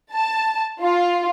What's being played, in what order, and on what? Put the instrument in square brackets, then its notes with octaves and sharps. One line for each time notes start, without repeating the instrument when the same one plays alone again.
[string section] A5
F4